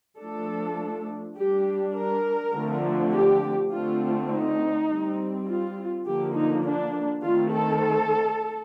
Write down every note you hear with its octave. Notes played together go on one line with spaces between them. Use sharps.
F3 A3 D4 A4
G3 D4 G4
A#4
D3 F3 A3 C4
G4
D3 A3 C4 F4
D#4
G3 C4
F4
D3 F3 A#3 G4
D#4
D4
D#3 A3 C4 F4
A4